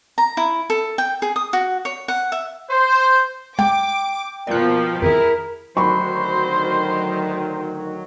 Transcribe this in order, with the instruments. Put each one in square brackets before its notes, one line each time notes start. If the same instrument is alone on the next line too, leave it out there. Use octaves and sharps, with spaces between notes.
[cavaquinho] A#5
E4
A4
G5
G#4
D#6
F#4
C#5
F#5
E5
[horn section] C5
[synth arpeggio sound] G#3 [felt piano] G5 [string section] D6
[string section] B2 F3 [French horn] A#3 [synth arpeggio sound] D5 F#6
[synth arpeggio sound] F2 D#3 [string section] E4 G#4 [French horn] A#4
[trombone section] D2 D#3 [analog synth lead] F#3 [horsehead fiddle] C5 [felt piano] B5 C#6